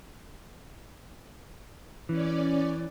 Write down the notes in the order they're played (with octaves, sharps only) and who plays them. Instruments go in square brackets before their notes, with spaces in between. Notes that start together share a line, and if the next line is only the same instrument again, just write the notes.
[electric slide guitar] E3 [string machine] C#4 D5